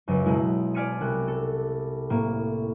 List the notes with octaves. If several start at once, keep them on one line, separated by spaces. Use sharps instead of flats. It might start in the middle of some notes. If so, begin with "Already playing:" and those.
C#2 F#2
B1 G#3 E4
D5 G#5 F6 B6 C#7 D#7
C2 F#6
A4
A2 A#3